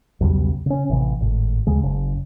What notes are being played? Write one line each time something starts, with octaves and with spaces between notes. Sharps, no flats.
B1 E2 C#3 G3
C#3 C#4
A1 C3 E3
G#1 A2
D2 C#3 G#3
F#1 C#3